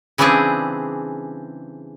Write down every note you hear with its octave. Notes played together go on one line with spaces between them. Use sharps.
C#3 E3 G3 C4 D4 G#4